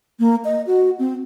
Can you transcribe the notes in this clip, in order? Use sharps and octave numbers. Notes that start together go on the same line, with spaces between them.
A#3
D#5
F#4
C4